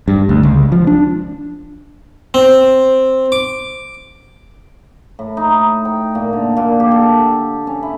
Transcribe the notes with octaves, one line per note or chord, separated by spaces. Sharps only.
G2
D2
C#2
F3
D4
C4
D6
A2
D#4
G5
A#2
D3
A#2
G4
A4
C#4
E4